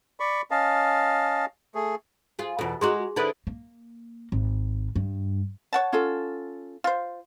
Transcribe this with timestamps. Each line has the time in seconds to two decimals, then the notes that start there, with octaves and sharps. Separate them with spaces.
0.20 D5 B5 C#6
0.51 C#4 D#5 F5 A5
1.75 A3 G#4
2.39 F4 G#4
2.59 E2 B2 F4 A4
2.81 G#3 D#4 F#4 G#4 C6
3.16 D3 D#4 E4 B4 D#6
3.47 A#3
4.32 G#1
4.96 G2
5.73 C#5 F#5 A5
5.92 C#4 F4 A4
6.84 F4 C5